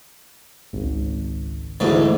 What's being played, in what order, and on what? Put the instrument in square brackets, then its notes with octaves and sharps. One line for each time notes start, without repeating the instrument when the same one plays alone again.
[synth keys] G#1 C#2
[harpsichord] D2 G#2 D3 [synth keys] E3 A3 E4